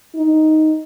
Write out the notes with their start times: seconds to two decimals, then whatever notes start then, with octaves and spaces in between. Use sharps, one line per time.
0.15 D#4